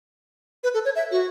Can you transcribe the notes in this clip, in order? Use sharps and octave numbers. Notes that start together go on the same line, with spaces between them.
B4
A4
C#5
E5
F#4